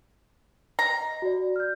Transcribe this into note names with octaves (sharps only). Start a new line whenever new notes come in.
A#5
D#5
F#4 D5
F6 G6